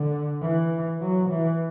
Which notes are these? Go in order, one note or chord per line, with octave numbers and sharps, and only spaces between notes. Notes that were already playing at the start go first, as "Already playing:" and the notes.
Already playing: D3
E3
F#3
E3